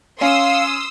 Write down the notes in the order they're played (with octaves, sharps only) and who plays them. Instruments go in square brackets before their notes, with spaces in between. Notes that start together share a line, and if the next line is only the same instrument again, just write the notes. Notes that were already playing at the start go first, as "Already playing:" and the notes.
[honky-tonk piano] C#4 [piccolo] F5 [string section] C6 D#6 E6